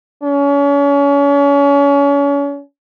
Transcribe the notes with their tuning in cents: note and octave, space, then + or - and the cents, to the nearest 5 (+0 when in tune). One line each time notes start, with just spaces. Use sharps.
C#4 +35